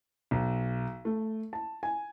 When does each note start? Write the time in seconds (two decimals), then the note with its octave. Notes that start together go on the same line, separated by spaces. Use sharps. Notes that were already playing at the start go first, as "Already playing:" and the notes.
0.31 B1
1.05 A3
1.53 A5
1.83 G#5